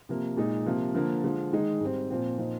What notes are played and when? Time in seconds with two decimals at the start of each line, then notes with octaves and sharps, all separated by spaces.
0.09 C3 F3 A#3
0.37 A#2 G#3 D#4
0.66 C3 F3 A#3
0.94 D3 F3 A#3
1.24 D3 F3 G#3
1.52 D#3 G#3 D#4
1.80 G#2 G3 C4
2.10 A#2 F3 C4
2.38 A#2 F3 C4 D#4